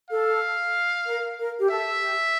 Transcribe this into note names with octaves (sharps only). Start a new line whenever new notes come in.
A4 F5
A#4
A#4
G4
A4 E5
G4